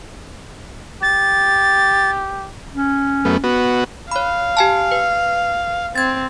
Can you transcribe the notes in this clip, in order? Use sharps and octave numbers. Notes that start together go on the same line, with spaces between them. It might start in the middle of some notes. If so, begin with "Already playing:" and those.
G4 A6
C#4
F#2 A3 B3
B3 F#4
C#5 F5 B5
G4 G#5 A5
B4
C4 G#6 A6